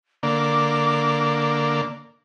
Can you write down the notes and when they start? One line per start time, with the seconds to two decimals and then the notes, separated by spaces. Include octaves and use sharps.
0.23 D3 A#3 D6